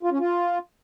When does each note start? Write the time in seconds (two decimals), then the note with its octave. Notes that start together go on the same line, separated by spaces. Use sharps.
0.03 F4
0.11 C#4
0.19 F4